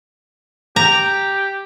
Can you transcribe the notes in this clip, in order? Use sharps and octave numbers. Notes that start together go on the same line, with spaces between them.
G4 A#5